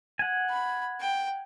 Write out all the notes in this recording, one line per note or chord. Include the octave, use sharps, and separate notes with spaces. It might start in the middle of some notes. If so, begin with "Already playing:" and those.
F#5 G#5
B5
G5